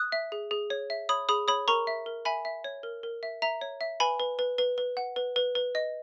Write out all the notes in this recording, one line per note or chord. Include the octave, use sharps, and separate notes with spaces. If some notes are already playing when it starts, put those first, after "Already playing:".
Already playing: D#6 F#6
E5
G#4
G#4
C#5
E5
C#5 B5 D#6
G#4 B5 D#6
C#5 B5 D#6
A#4 A#5 C#6
E5
A#4
E5 G#5 B5
E5
C#5
A#4
A#4
E5
E5 A#5
C#5
E5
B4 G#5 B5
B4
B4
B4
B4
F#5
B4
B4
B4
D#5